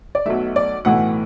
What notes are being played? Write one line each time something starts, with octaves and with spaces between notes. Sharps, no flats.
D5
B1 B2 F#3 A3 E5
D5
B1 A2 E3 A3 F#5